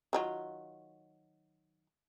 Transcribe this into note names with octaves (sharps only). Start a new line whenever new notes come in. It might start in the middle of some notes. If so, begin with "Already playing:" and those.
D#3 F#3 F4